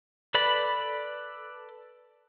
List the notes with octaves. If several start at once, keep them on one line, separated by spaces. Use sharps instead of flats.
A4 B4 D5 B5